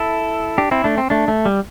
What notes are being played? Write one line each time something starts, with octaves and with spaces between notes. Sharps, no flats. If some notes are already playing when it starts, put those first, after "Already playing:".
Already playing: E4 A4
D4 G4
C4 E4
A3 D4
C4
A3 D4
A3
G3